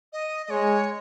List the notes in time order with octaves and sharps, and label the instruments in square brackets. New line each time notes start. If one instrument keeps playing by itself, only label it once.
[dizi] D#5
D#5
[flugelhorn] G#3 [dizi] C#5